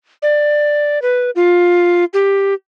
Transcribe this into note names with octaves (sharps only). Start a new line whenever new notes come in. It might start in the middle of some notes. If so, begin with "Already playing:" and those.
D5
B4
F4
G4